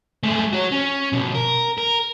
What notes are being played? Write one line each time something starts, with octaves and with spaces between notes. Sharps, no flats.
G#3 A3
F#4 C#5
C#4
B2 F3
A#4
A#4